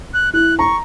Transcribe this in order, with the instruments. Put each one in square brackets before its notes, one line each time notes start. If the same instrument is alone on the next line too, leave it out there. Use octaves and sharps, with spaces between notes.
[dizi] F#6
[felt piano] E4 [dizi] F#6
[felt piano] A#5 [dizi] C#6